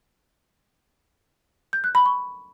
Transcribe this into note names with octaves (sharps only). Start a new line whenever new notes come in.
G6
F#6
B5
C#6